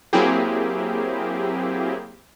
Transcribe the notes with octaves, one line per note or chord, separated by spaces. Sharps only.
F#3 A#3 C4 E4 G4 G#4